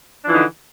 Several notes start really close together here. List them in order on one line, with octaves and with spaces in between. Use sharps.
D4 F3 E3 D3 D#4